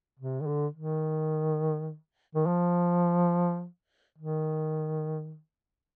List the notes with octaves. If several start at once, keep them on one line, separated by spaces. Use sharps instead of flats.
C3
D#3
D3
D#3
D#3
F3
D#3